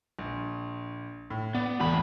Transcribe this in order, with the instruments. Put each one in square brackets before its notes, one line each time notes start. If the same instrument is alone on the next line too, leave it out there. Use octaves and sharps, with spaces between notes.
[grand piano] A#1
A2
[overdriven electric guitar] B3 [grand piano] D5
[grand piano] D1 E2 [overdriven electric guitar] A2 B5